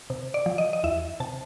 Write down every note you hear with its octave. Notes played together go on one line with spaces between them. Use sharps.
C3
D5
F3
D#5
D#5
E2 E5
C3 A5